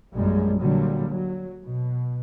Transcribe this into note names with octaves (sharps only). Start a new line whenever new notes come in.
A#1 F#2 G3 G#3
A#2 D3 F#3 G3
F#3
B2